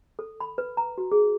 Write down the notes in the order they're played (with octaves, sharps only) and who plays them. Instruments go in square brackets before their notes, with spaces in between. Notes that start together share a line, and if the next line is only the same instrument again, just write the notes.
[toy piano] A4
B5
B4
A#5
F#4
G#4